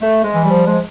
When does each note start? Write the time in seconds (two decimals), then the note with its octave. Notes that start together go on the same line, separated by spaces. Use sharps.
0.01 A3
0.23 G#3
0.34 E3
0.45 G3
0.51 F3
0.67 F3 G#3